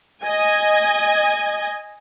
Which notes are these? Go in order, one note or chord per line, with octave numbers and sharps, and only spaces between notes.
D#5 G#5